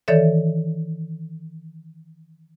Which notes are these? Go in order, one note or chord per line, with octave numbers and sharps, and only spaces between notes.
D#3 E3 A4 C#5 D5 E5